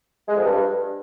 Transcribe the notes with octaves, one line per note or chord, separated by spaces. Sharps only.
G#3
F2
G2